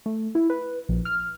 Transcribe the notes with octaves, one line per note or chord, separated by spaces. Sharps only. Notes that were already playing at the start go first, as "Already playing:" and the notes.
A3
E4
B4
A#1
F6